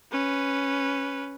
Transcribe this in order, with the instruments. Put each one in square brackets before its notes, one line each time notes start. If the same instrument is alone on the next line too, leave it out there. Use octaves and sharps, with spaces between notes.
[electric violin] C#4 B4